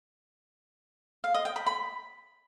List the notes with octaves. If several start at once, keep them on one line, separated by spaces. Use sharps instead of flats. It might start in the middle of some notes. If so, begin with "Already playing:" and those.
F5
D#5
G5
B5
B5